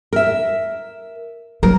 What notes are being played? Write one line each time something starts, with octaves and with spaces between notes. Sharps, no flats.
A#4 E5
F#3 A#4